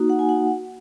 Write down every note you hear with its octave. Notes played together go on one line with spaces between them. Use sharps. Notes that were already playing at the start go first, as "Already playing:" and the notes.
Already playing: A#3 D#4 F#4
F#5
G#5
F#5